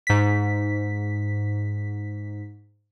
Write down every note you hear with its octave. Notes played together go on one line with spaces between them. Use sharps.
G#2 B6